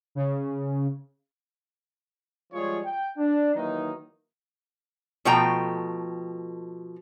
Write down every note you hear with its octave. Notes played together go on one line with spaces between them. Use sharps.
C#3
F3 G3 G#3 F4 G#4 C#5
G5
D4
D#3 E3 F#3 A#3 D#4
B2 F3 A3 G5 A#5